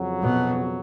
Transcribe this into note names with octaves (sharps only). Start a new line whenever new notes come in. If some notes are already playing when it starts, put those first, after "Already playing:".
Already playing: F2 C#3 F#3
B2